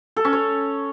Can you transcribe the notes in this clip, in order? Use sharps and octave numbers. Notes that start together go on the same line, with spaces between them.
A4
C#4
C#5